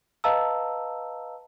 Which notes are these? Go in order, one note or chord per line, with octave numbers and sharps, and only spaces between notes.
B4 D#5 F5 A5 A#5 E6